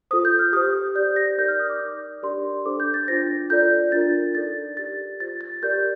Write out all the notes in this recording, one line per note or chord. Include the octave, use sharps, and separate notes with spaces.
F4 A4 C5 D#6
G6
F6
G4 C5 D#6
G4 D5 G6
A#6
D#4 A#4 D5 G6
F6
D#6
D6
D#4 A#4 D5
D4 G4 A#4 D5 C6
D4 A4 C5 D6
G6
A6
D4 F4 C5 A#6
F4 A4 D5 G6
D4 F4 A#4 A6
D#4 A4 D5 A6
G4 D5 A6
F4 C5 A6
A6
G4 A#4 D5 G6